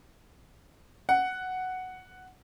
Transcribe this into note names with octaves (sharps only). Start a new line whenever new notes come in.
F#5